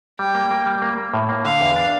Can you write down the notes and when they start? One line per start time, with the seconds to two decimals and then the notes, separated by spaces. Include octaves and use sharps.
0.19 G3 G5
0.35 A#3
0.51 A#3
0.66 G3
0.82 A#3
0.98 A#3
1.14 A2
1.29 A#3
1.45 D3 F5
1.61 E2
1.76 D4